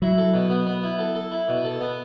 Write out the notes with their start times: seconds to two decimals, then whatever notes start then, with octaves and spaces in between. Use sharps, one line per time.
0.02 F#3 E4
0.18 A4
0.34 B2
0.50 B3
0.67 B3
0.83 E4
0.99 A4
1.15 A4
1.32 E4
1.48 B2
1.64 A4
1.81 B3